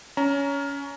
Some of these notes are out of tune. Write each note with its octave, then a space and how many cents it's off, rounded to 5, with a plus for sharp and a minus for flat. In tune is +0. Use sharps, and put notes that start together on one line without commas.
C#4 +20 A#5 +0